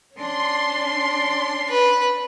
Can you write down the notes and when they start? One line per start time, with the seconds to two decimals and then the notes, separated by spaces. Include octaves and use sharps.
0.15 C#4 D4 C6
1.69 B4